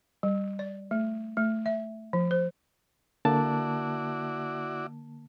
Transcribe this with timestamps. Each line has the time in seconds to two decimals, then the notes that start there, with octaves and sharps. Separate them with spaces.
0.23 G3
0.59 D5
0.91 A3
1.37 A3
1.66 E5
2.13 F3
2.31 C5
3.25 D3 A#3 E4 F#4 D5 A5